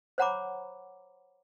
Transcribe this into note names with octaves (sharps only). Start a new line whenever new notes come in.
C5 C#5 F#5 A#5 B5 D6